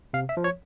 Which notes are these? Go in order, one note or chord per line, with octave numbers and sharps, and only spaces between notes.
C3 F5
E5
F3
C#5